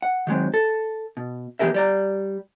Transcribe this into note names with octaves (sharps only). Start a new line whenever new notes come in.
F#5
D#3 F#3 G#3 C4
A4
B2
E3 B3 G4 G#4 A#4 E5
G3 D5 A#5